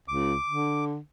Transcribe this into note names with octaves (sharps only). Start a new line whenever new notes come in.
C#2 D6
D3